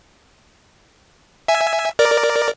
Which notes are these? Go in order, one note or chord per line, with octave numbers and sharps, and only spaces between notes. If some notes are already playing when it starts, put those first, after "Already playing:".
E5 G#5
A#4 D5